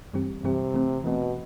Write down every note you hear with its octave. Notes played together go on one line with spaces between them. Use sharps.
G2 E3 G3 C4 G4
G2 C3 E3 G3 C4 G4
E3 A3 C4
B2 E3 A3 C4